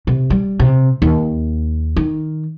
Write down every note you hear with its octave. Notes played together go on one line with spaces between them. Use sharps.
C3
G3
C3
D#2
D#3